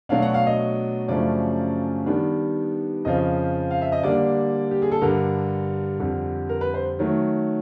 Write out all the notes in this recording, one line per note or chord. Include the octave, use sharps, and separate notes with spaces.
B2 F#3 A3 D4 F5
F#5
F5
D#5
F#2 C#3 F3 A3 D4 D5
D#3 G3 B3 D4
F2 C#3 F3 D#5
F5
E5
D#5
D3 G3 A#3 D4 D5
G4
G#4
A4
G2 D3 G3 A#4
F2 D3 G3
A#4
B4
C5
D#3 F#3 A3